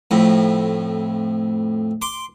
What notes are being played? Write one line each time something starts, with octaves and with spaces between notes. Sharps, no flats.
F2 A2
C6 D6